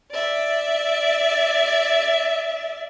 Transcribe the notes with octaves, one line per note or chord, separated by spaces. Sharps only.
D5 E5